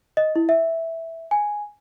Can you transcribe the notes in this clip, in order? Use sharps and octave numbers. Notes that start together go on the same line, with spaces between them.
D#5
E4
E5
G#5